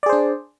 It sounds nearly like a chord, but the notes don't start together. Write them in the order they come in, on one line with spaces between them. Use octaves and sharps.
D5 G#4 C5 D4